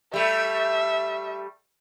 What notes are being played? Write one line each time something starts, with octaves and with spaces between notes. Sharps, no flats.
G3 A3 E5